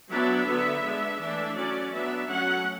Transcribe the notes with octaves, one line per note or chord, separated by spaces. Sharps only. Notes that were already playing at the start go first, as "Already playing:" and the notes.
F#3 B3 D4 E5
D3 F#3 B3
G#3 B3 D4
E3 A3 D4 E5
F#3 C#4 D5
F#3 B3 D4 E5
F#3 A3 C#4 F#5